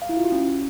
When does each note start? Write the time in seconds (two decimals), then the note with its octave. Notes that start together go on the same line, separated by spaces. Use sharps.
0.02 F5
0.09 E4
0.17 F4
0.24 F#4
0.32 C#4